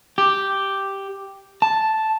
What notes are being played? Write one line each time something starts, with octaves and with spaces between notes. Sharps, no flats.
G4
A5